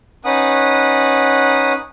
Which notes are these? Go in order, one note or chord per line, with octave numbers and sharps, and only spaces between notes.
C#4 D#4 B4 F#5 D#6